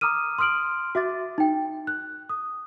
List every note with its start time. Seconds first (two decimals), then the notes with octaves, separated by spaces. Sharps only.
0.01 A#5 D6 D#6 F6 D#7
0.38 C6 D#6 F6 D7 F#7
0.95 F#4 E5 D6 A6
1.38 D#4 G5
1.87 F#6
2.30 D#6